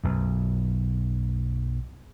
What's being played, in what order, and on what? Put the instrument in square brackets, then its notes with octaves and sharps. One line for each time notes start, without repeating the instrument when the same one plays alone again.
[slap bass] B1 F#2